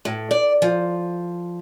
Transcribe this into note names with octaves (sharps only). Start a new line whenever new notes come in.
A2
D5
F3